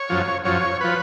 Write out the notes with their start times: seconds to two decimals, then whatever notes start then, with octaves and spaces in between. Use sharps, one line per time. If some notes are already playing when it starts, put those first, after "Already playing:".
Already playing: C#5
0.09 F#2 F3
0.45 F#2 F3 C#5
0.81 F3 B4